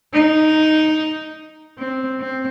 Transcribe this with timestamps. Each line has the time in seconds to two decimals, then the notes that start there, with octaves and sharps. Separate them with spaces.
0.14 D#4
1.79 C4
2.20 C4